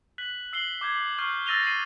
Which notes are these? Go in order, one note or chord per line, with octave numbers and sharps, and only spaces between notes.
F#6 B6 F#7
E6 C7 F#7 G7
D6 G6 G#6
C#6 F6 G6 C7
E6 A6 A#6 D#7 F7 G7
C7 D#7